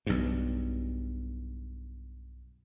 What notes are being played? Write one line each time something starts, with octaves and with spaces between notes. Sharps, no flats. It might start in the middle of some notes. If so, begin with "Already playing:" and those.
B1 G2